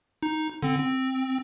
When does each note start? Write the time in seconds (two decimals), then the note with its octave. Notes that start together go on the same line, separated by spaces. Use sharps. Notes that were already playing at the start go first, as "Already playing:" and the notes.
0.23 D#4
0.63 D3 C4
0.79 C4